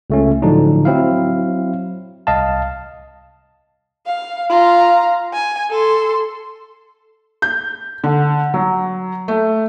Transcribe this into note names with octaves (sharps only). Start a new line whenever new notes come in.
C#2 A3 C#4
A2 D3 F3 F#3 D4 D#4
F#3 C4 E4 F5
C2 D#5 F5 A5
F5
F4 A#5
G#5
A4 C6
G6
D3
F#3
A3